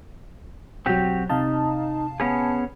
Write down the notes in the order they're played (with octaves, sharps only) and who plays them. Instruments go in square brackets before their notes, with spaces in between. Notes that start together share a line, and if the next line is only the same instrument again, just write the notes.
[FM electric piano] B1 F#3 [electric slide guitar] C4 F#4 G4
[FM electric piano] C3 F5 A5 [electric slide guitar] D#4
[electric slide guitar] B3 C#4 G#4